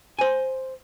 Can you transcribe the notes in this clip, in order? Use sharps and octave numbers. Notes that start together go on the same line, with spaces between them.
C5 G#5